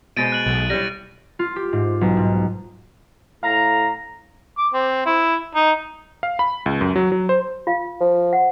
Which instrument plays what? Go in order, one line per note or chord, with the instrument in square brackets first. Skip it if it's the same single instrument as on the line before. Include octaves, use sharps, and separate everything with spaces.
[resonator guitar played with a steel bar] B2 G#3 C5 [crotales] A6 D7 D#7
[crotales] F#6 F#7
[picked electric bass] B1
[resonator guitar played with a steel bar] G3 E4 C#5 [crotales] A#6
[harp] F4
G4
G#2
B1
G#2
[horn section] A2 F5 A#5
[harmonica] D6
C4
E4
D#4
[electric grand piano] F5
B5
C#2
F#2
F#3
F#3
C5
[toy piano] F4 F5
[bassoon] F3
[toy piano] F#5